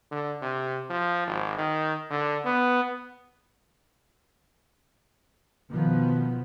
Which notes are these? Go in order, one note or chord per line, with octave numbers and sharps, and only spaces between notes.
D3
C3
F3
G#1
D#3
D3
B3
B2 D#3 F3 B3